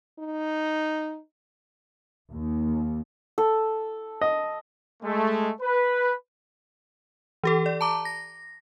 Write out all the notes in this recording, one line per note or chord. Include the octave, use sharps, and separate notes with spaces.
D#4
D#2
A4
D#5
G#3 A3
B4
E3 G4 A4
D5
A5 A#5 D6
A#6